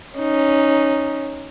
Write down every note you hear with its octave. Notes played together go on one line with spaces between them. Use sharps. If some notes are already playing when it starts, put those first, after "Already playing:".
C#4 D#4